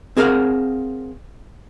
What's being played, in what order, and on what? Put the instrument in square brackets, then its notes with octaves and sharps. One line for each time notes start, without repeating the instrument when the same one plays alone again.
[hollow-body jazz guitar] C4 G#4 A#4 C#5 F5 F#5